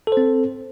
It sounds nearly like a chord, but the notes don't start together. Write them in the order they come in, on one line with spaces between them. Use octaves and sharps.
A4 C5 C4